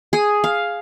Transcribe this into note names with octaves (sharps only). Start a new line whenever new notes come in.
G#4
F5